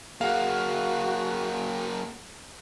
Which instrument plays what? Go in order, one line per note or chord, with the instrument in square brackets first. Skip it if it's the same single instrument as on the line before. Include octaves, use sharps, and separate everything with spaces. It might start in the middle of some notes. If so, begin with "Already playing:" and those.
[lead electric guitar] F#2 A#3 [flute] F#4 [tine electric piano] G#4 F#5 [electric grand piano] F5